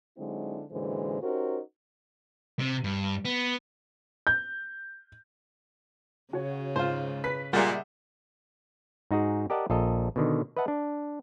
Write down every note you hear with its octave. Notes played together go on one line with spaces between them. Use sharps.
D3 F#3 G#3 C4 D#4 E4
F#2 A#2 D3 E3 G#3 C5
C#4 D#4 F#4 G4 A#4 C5
C3
G2
B3
G6
C#3 F#4 C#5
G#2 F4 C5
B4 B6
A#2 G3 G#3 A#4 E5 F#5
G#2 D#4 F#4 G#4
G4 A#4 D5 D#5 F#5 A5
A#1 F4 A4 D#5 A#5
B2 D3 D#3
B4 D#5 E5 F#5 A5
D4